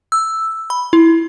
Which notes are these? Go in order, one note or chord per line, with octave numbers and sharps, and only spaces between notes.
E6
B5
E4